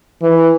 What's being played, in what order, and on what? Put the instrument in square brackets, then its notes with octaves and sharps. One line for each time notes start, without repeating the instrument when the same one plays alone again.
[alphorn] E3